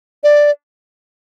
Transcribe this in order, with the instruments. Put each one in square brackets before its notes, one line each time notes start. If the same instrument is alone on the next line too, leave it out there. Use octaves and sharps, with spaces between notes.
[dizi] D5